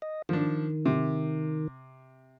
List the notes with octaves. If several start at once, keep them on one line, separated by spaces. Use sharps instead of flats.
D#5
D#3 F3 D4
C3